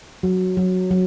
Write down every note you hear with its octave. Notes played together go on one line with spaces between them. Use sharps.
F#3
F#3
F#3